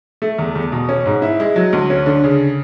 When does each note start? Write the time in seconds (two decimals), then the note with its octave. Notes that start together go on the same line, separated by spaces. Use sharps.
0.22 A3
0.39 E2
0.55 E2
0.72 B2
0.89 C#4
1.06 G#2
1.22 E4
1.40 G#3
1.56 F#3
1.73 D2
1.90 C#4
2.06 D3
2.24 C#3